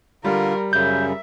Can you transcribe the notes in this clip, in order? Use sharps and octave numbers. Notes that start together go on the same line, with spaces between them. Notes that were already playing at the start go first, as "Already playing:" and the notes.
D3 G3 F4 A#4
F#2 C#3 E5 G6